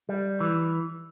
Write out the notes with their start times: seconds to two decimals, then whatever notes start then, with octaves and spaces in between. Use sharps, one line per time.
0.09 G3
0.40 E3